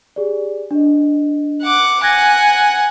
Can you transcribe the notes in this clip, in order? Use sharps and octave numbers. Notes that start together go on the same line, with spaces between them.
G4 G#4 D5
D4 D#5
F#5 D6
F#5 G#5 F#6 G#6 A#6